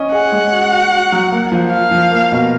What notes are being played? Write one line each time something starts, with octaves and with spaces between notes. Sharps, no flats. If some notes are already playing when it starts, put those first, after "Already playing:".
Already playing: C#4 D#5
G#4 F#5
G#3
F#4
F#4
F#4
F#3
A#3
F3
F4 F5
F3
A#3
B2